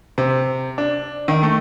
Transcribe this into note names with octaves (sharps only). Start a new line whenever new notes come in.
C3
D4
D#3
A3